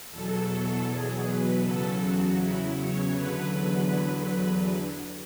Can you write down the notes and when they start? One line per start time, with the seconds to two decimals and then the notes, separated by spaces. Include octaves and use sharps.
0.11 E2 B2 F#3 A4
0.87 G#4
1.24 B4
1.62 E2 C#3 F#3 A4
2.00 F#4
2.38 E4
2.76 C#5
3.13 E2 D3 F#3 B4
3.89 B4